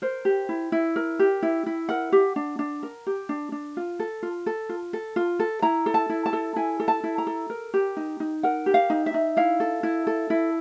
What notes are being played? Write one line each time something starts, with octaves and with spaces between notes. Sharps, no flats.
A#4 C5
G4
E4
E4
A#4
G4
E4
E4
A#4 F#5
G4
D4
D4
A#4
G4
D4
D4
F4
A4
F4
A4
F4
A4
F4
A4
E4 A#5
A4
A5
E4
A5
A4
E4 G#5
A4
A5
E4
A#5
A4
A#4
G4
D#4
D#4
A#4 F#5
G4
F5
D#4
E5
D#4
E4 F5
A4
E4
A4
E4